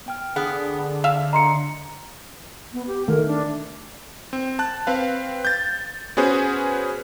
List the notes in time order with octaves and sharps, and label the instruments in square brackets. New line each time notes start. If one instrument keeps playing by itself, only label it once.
[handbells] B3 G5 F6
[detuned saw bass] D3 [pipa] B3 [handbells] G#4
[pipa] E5 F5
[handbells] D#5 A5 C7 [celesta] A#5 C6 C#7
[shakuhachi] B3
G4
[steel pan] D#3 A3 [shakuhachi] A#4
[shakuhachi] D4
[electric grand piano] C4
A5 F#6
C4 B4 F5
G6 A6
B3 C#4 F#4 G#4 B4 C5